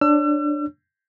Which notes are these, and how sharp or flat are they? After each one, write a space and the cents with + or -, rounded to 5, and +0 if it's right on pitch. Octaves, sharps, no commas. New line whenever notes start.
D4 +10 C#5 +0 E6 +40